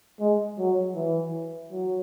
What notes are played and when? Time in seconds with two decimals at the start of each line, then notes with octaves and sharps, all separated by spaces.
0.20 G#3
0.58 F#3
0.95 E3
1.71 F#3